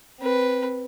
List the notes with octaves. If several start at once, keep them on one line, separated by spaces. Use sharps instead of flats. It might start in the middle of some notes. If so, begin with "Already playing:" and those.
C4 B4